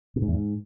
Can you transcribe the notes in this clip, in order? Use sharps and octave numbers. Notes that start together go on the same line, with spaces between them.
B2
G#2
E2
G#2